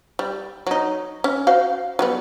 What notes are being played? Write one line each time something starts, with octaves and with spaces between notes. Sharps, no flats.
G3
F#3 D#4
C#4
F#4 C5 F5
F#3 G3 B3